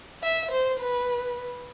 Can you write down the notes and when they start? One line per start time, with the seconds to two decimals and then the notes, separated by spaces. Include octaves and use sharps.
0.23 E5
0.51 C5
0.80 B4